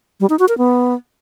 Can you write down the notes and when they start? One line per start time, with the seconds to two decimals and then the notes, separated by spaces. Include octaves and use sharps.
0.20 G3
0.30 D#4
0.39 F#4
0.49 A#4
0.58 B3